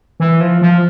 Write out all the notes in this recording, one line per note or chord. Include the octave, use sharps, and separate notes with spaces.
E3
F3
F3